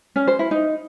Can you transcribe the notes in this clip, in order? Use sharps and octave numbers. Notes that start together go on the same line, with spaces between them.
C#4
C5
E4
D#4